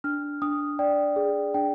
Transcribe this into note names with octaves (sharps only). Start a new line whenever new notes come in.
D4 F6
D4 D#6
D5 G5
G#4
D4 G5